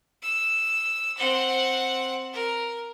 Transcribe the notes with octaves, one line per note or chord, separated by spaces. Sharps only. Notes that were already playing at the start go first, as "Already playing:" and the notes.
E6
C4 F#5
A#4